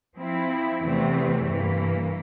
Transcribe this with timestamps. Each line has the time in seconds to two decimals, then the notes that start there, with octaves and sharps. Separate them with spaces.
0.16 F3 C4 E4
0.82 E2 C3 E3 A3 C4
1.46 G2 E3 A#3